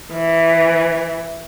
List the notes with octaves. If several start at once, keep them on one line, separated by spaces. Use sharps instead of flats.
E3